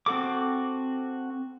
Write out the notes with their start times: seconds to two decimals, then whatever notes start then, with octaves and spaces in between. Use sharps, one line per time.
0.06 C4 F#4 A4 D6